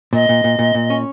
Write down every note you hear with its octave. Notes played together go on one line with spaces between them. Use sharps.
A#2 D#5
A#2
A#2
A#2
A#2
C#4